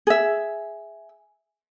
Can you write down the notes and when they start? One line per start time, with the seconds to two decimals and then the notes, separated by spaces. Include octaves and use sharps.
0.07 G#4 E5